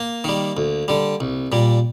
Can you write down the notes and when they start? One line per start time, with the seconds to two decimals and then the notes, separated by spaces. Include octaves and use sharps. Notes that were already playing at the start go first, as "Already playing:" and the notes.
Already playing: A#3
0.24 D#3 G3
0.57 D2
0.88 D3 G3
1.20 C2
1.52 A#2 G3